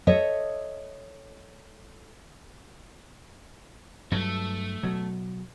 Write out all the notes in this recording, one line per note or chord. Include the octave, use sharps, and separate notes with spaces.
A4 C#5 D#5 E5
G2 F#3 A3
B2 F#3